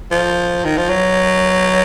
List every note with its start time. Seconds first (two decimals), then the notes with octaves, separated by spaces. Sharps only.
0.11 F3
0.65 D#3
0.77 F3
0.90 F#3